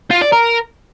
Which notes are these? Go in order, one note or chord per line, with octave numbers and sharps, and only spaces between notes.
F4
D5
A#4